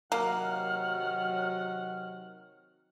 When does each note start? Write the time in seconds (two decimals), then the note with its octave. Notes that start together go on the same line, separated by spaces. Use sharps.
0.12 C3 D#3 F#3 A#3 F#5 F6